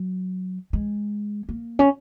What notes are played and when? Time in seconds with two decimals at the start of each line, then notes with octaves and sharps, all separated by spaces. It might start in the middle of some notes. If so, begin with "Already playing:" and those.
Already playing: F#3
0.73 G#3
1.49 A#3
1.79 C#4